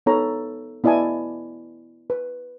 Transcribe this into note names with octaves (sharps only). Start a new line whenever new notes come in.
B3 D#4 A4 C#5 A#5 B5
B3 E4 D5 D#5 G#5 A5
B4